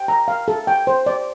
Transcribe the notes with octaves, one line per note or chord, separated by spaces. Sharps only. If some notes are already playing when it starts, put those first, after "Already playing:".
Already playing: G5
A#5
F5
A4
G5
C5
D5